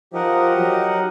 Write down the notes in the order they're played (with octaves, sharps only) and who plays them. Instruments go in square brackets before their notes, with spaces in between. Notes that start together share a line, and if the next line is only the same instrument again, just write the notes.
[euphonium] F3 [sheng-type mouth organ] D#4 G4 A#4 D#5 F#5
[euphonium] F#3